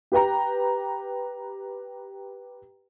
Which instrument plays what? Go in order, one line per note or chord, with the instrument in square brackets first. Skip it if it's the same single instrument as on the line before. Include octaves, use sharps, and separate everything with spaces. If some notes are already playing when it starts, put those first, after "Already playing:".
[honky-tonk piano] G4 B4 G5 A#5